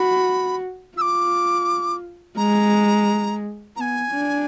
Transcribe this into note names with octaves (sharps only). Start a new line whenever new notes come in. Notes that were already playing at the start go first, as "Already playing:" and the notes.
Already playing: F#4 B5
F4 D6 E6
G#3 A#5
B3 G#5 A#5
D4